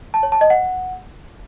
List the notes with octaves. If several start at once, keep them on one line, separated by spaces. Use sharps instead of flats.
A5
C#5
A5
D#5
F#5